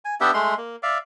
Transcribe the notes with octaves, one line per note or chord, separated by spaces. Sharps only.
G#5
B3 D4 G4 E5
G#3 A3 C6
A#3
D5 E5 F5